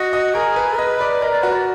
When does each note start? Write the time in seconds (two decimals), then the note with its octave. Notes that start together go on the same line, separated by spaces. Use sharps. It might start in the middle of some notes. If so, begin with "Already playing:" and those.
Already playing: F#4 D#5
0.13 D#5
0.34 G#4 A#4
0.56 B4
0.78 B4 D#5
1.01 D5
1.22 A#4 D#5
1.31 D5
1.42 F#4 B4
1.52 D5